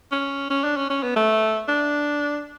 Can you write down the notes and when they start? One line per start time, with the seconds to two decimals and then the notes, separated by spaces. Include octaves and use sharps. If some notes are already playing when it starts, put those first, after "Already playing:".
0.11 C#4
0.50 C#4
0.64 D4
0.77 C#4
0.90 C#4
1.03 B3
1.16 A3
1.68 D4